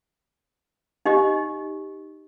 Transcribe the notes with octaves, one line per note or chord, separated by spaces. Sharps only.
D#4 G4 D#5